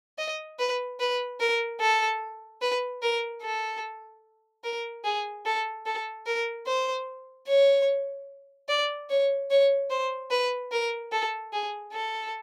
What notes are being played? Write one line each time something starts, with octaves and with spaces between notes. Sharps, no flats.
D#5
B4
B4
A#4
A4
B4
A#4
A4
A#4
G#4
A4
A4
A#4
C5
C#5
D5
C#5
C#5
C5
B4
A#4
A4
G#4
A4